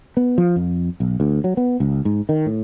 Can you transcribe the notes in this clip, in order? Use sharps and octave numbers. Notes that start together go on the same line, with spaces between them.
B3
F3
F2
B1
D2
F#3
B3
C#2
G#2
D#3
A2